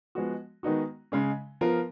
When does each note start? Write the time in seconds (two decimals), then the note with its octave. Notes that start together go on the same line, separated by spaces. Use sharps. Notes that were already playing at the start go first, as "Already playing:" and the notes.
0.15 F3 G#3 B3 F#4
0.63 D#3 G#3 B3 D#4 F#4
1.12 C#3 G#3 C#4
1.61 F3 B3 F4 A#4